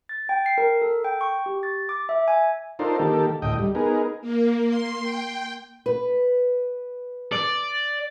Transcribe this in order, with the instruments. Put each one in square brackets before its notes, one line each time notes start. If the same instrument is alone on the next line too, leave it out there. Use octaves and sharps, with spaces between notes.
[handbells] A6
G5
C7
A#4
A4
G5
C#6
G4
A6
D6
E5
G#5
[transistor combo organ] D4 D#4 F4 A4 A#4 C5
D#3 A#3 G4 A4
D2 A2 D#5 G5
G3
B3 D#4 G#4 A#4
[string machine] A#3
C6
G5
[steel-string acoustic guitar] B4
[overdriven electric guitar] D5